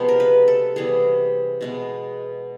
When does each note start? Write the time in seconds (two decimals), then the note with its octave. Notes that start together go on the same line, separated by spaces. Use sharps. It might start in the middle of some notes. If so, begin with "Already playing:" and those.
Already playing: C3 F3 G#3 B3 C5
0.09 A#4
0.20 B4
0.48 A4
0.76 C3 E3 G3 B3 G#4
1.61 B2 G#3 B3